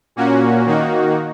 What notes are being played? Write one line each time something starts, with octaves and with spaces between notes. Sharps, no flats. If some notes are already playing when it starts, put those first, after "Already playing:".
A#2 A#3 C#4 F#4
D#3 A#3 D#4 F#4